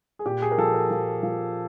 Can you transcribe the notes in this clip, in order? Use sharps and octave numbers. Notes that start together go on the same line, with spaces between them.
G#4
A#2 G4
G#4
A#4
F3 A4
A#4
F3
F3